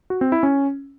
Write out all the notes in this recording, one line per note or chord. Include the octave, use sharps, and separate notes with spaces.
F#4
C4
E4
C#4